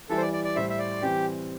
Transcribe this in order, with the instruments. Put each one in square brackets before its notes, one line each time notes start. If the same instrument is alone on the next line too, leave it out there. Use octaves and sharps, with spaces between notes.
[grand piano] E3 G3 E4 [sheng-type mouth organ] A4
[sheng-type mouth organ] C5
D5
D5
D5
[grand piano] A2 G3 E4 C5 [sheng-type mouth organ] E5
[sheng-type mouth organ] E5
D5
[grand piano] E3 G3 C4 [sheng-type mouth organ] G4